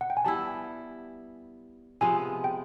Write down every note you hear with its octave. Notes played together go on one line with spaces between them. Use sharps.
F#5
G5
G#5
G3 B3 E4 A5
C3 F3 G#3 B3 G#5
G5